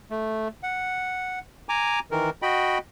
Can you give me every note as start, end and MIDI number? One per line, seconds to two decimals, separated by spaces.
0.11 0.48 57
0.63 1.39 78
1.69 2.00 80
1.69 2.00 82
1.69 2.00 86
2.11 2.30 51
2.11 2.30 52
2.11 2.30 70
2.42 2.78 66
2.42 2.78 75
2.42 2.78 79
2.42 2.78 83